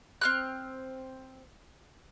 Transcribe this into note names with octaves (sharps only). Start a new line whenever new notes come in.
C4 F6 F#6